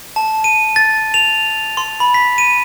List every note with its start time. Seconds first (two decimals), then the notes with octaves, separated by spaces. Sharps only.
0.16 A5
0.44 D#7
0.76 A6
1.14 F7
1.77 C6
2.00 B5
2.14 B6
2.38 D#7